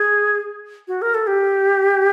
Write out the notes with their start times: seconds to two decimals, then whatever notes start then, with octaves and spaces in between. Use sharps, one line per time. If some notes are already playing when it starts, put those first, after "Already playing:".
Already playing: G#4
0.88 F#4
1.02 A#4
1.14 A4
1.27 G4